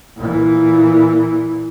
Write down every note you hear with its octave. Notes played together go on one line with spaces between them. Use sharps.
A#2 E3